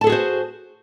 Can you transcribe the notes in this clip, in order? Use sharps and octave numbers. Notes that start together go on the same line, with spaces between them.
F#4 G#4 A4 C5 A5